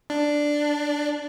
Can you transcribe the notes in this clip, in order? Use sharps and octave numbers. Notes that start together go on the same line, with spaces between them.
D4